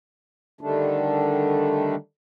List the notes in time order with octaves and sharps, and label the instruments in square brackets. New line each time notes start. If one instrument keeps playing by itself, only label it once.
[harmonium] D3 D#3 G3 A3 D4